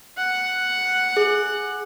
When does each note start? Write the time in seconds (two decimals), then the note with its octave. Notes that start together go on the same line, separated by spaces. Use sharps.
0.17 F#5
1.17 G#4